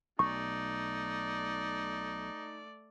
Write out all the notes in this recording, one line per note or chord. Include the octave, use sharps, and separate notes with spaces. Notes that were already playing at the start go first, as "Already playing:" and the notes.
B1 A3 D#4 D5 C#6